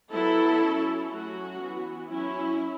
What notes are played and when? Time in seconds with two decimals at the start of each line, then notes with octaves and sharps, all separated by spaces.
0.11 F#3 B3 E4 A4
0.62 F#3 C#4
1.11 F#3 A3 C#4 F#4
1.60 E3 B3
2.10 F#3 C#4 E4